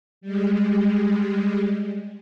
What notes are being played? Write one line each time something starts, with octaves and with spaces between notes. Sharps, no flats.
G3 G#3